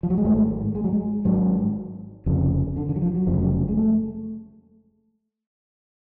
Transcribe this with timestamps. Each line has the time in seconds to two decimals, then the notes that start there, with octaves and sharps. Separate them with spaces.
0.03 F3
0.10 F#3
0.18 G#3
0.25 G#1 G#2 A3
0.75 G#3
0.84 F#3
0.93 G#3
1.25 G#1 G#2 F#3
2.26 F1 F2 C#3 F3
2.77 D3
2.89 D3
2.96 F#3
3.02 F3
3.15 F#3
3.27 F1 F2 C#3 F3
3.39 F#3
3.68 G#3
3.77 A3